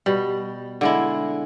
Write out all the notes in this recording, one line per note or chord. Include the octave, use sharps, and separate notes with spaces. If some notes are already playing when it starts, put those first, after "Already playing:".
B2 G3
D3 G#3 E4